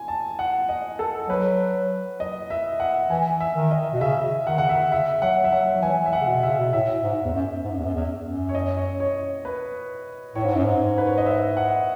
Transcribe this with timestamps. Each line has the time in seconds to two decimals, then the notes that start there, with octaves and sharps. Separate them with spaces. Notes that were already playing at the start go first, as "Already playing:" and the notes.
Already playing: G#5
0.08 A5
0.39 F#5
0.69 D#5
0.99 A4
1.29 F#3 B4
2.20 D#5
2.50 E5
2.80 F#5
3.10 E3 G#5
3.40 E5
3.56 D#3
3.71 D#5
3.93 B2
4.01 C#3 E5
4.47 D#3 F#5
4.58 C#3 F#5
4.69 D#3 E5
4.92 C#3 E5
5.22 F#3 F#5
5.44 E5
5.52 F#3 F#5
5.75 F#3
5.82 E3 G#5
6.06 E5
6.13 F#5
6.21 C#3
6.28 B2
6.43 C#3 E5
6.59 B2
6.73 A2 E5
7.03 G#2
7.25 E2
7.34 F#2
7.64 G#2
7.71 F#2
7.78 E2
7.85 F#2
7.95 E2
8.25 F#2
8.49 C#5
8.55 D#5
8.78 C#5
9.00 C#5
9.45 B4
10.35 A2 C#5
10.46 G#2
10.55 F#2
10.64 G#2
10.98 B4
11.07 C#5
11.18 D#5
11.26 E5
11.57 F#5